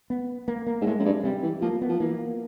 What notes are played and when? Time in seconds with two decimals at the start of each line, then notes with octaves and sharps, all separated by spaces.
0.10 B3
0.48 A#3
0.67 A#3
0.81 G#2
0.86 A2 G#3
0.99 F#2
1.05 G2
1.24 C3 G3
1.43 E3
1.61 F3 A#3
1.81 B3
1.89 F3
2.00 E3 A#3